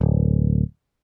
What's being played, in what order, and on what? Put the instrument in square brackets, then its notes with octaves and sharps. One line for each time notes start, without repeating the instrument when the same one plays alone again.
[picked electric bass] D1